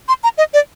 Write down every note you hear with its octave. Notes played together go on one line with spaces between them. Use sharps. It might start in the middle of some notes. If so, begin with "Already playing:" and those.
C6
A#5
D#5
D5